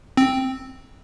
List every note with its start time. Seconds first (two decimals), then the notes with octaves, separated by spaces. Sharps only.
0.17 C4